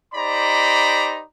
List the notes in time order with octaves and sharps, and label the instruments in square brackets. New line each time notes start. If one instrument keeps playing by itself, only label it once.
[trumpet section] D#4 G4 C5 D5 A#5 B5